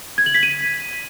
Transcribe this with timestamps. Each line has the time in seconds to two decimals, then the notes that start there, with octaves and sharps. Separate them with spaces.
0.18 G#6
0.26 F#7
0.34 B6
0.43 D#7